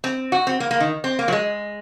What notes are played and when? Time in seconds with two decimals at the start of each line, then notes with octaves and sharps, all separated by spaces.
0.04 C4
0.32 F#4
0.47 C4
0.60 A#3
0.71 A#3
0.80 D#3
1.04 C4
1.19 A#3
1.28 F#3
1.32 G#3